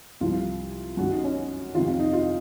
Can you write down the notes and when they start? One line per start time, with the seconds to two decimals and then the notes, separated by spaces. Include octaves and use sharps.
0.21 C2 C3 F3 F4
0.97 F#2 D#3 F#4
1.10 D#4
1.23 C#4
1.75 F2 C3 D#3 F4
2.00 D#4
2.13 F4